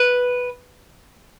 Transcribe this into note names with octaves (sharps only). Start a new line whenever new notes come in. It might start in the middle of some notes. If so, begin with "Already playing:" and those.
Already playing: B4